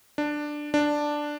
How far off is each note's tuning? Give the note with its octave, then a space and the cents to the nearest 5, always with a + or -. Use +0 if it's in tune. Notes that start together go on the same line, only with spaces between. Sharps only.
D4 +10
D4 +5